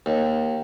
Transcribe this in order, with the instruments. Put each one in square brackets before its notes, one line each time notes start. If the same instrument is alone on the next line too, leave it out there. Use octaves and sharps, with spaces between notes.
[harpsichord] D#2